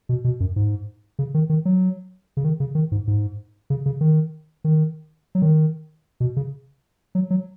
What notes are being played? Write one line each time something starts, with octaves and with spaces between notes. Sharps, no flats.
B2
B2
F#2
G#2
C#3
D#3
D#3
F#3
C#3
D#3
C#3
D#3
G#2
G#2
C#3
C#3
D#3
D#3
F#3
D#3
B2
C#3
F#3
F#3